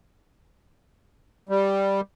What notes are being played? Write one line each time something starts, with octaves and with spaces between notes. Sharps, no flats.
G3